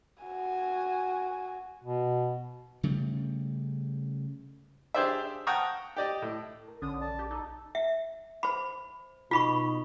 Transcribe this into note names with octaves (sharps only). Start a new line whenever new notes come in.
F#4 G#5
B2
C#3 G3 A3
D4 G4 G#4 C5 D5 E5
F#5 G5 A5 A#5 C#6 D#6
G4 D5 D#5
A2
A#4
A#1 D3 C#4 D#6
D5 A5
G4
D#4 A4 A5
E5
C5 B5
B2 D#4 F4 B5 C#6